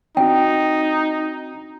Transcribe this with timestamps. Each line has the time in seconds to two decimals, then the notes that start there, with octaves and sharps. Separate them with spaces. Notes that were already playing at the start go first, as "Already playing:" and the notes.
0.17 C4 D4 D#4 F#4 G5